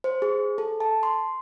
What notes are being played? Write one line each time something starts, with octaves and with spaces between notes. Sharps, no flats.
C5
G#4
A4
A5
C6